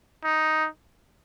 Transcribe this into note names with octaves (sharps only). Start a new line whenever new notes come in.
D#4